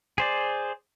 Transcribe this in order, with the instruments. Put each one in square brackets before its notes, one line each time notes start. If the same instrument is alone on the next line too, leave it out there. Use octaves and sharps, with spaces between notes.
[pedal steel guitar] G#4 C5 D5